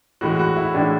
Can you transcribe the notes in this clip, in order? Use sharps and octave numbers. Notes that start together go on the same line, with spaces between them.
A2 E3 G#3 F#4
F#4
E4
A2 E3 G#3 D4